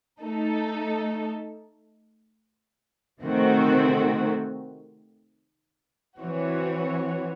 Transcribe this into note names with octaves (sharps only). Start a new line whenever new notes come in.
A3 D#4 A4
C3 D#3 A3 C4 F#4
E3 C4 F#4 C#5